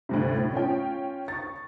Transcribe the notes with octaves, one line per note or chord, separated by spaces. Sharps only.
D2 G2 C3
A2
C#4 F4 G5
C#6 A6